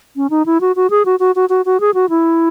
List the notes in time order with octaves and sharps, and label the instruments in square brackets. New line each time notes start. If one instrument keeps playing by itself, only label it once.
[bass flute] C#4
D#4
E4
F#4
F#4
G#4
F#4
F#4
F#4
F#4
F#4
G#4
F#4
E4